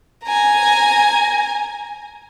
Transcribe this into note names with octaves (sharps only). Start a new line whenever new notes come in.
G#5 A#5